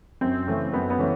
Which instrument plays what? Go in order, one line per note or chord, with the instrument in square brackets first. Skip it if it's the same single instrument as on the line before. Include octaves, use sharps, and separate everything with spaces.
[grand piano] F#2 [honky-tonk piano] C4
[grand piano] C#3 E3 A3 C#4
[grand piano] F#2 [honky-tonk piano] B3
[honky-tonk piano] B3
[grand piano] C#3 E3 A3 C#4